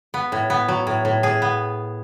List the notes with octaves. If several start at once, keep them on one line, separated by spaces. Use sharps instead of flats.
B3
A2
B3
F#3
A2
A2
A2 G#4
B3